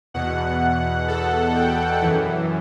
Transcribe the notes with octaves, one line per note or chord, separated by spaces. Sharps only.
E2 B2 F#5
A4
G5
F#2 E3